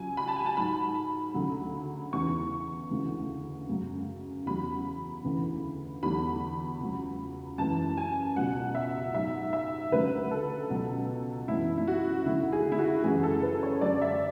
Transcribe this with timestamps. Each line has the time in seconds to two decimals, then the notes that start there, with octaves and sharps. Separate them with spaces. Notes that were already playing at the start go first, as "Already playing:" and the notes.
Already playing: C#2 F#3 G#5
0.17 B5
0.28 A5
0.36 G#5
0.46 A5
0.57 G#2 F#3 B5
1.34 D2 C#3 F#3
2.13 E2 C#3 E3 C#6
2.91 D2 C#3 E3
3.69 F#2 C#3 F#3
4.46 E2 C#3 F#3 B5
5.24 D2 C#3 E3
6.03 E2 D3 F#3 B5
6.80 C#2 C#3 F#3
7.58 F#2 E3 A5
7.97 G#5
8.36 C#2 B2 F#3 F#5
8.75 E5
9.14 G#2 F#3 E5
9.53 E5
9.92 D2 C#3 F#3 B4
10.31 A4
10.70 C#2 B2 F#3
11.48 F#2 E3 E4
11.78 E4
11.87 F#4
12.25 D2 C#3 F#3 E4
12.53 G#4
12.72 E4
12.79 F#4
13.04 F#2 C#3 E3 G#4
13.23 A4
13.43 B4
13.63 C#5
13.81 F#2 D3 F#3 D5
14.02 E5